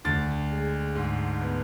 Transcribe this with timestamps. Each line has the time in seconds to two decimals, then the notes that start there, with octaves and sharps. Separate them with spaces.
0.05 D2 A6
0.50 G#3
0.95 G#2
1.41 B3